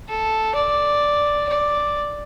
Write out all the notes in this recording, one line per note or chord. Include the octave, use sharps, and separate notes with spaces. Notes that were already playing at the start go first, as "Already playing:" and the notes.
A4
D5
D5